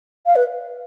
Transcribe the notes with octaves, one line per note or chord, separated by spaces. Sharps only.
F5
B4